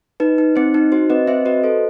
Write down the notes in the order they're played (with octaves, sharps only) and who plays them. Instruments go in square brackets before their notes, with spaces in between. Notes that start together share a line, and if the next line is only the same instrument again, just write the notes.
[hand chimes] D#4 B4
D#4
C4 C5
D#4
F#4 C5
C4 B4 D#5
C4 C5 E5
F#4 B4 D#5
A4 C5